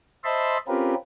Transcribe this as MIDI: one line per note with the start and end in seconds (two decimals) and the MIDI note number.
0.24 0.57 72
0.24 0.57 75
0.24 0.57 76
0.24 0.57 81
0.24 0.57 83
0.24 0.57 84
0.68 0.95 60
0.68 0.95 61
0.68 0.95 65
0.68 0.95 67
0.68 0.95 70
0.68 0.95 71